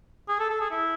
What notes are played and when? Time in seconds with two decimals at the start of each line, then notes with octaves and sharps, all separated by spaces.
0.29 G#4
0.40 A4
0.50 A4
0.60 G#4
0.71 E4